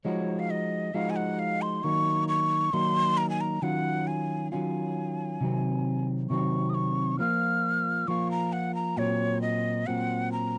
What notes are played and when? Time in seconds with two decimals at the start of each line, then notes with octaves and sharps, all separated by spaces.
0.05 F3 G#3 D#4 F#4 C#5
0.39 F5
0.50 D#5
0.94 F3 G#3 D#4 F#4 F5
1.10 G#5
1.16 F#5
1.39 F5
1.62 C6
1.84 D#3 F#3 A#3 D#4 C#6
2.28 C#6
2.73 D#3 F#3 A#3 D#4 C6
3.17 A#5
3.30 G#5
3.41 A#5
3.62 D#3 F#3 C#4 F4 F#5
4.07 G#5
4.52 D#3 F#3 C#4 F4 G#5
5.41 C3 D#3 F#3 C4
6.30 C3 D#3 F#3 C4 C#6
6.70 D#6
6.74 C#6
7.19 F3 A#3 F4 F6
8.08 F3 A#3 F4 C#6
8.31 A#5
8.53 F#5
8.75 A#5
8.97 A#2 F#3 C4 C#5
9.42 D#5
9.87 A#2 F#3 C4 F#5
10.32 A#5